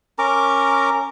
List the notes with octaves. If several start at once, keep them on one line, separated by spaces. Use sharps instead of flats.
C#4 A#4 A#5 D6